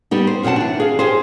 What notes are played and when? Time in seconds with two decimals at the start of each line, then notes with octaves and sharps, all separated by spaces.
0.11 G3 B3 D#4
0.27 C5
0.43 F#2 B2 C4 F#5 A5
0.56 E3 D4
0.80 G#4 F5
0.99 G4 G#4 C5